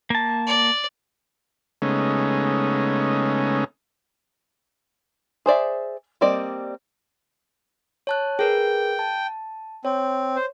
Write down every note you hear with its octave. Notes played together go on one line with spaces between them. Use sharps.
A#3 A5
D5
C#3 G#3 A3 B3 C#4 D#4
G#4 C5 D5 E5
G3 A#3 C4 D5 D#5
C#5 A5 F#6
G#4 A#4 B4 G5
A5
C4 C#5
C5